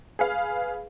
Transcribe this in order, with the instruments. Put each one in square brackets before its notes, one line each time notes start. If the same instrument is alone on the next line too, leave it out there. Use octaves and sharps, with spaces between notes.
[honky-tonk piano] G#4 B4 F5